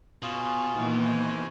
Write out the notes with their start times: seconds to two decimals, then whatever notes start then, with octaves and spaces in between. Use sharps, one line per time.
0.22 B2 C#4 F4 G#4
0.74 A#2 D#3 E3
1.05 A3 C5 G#5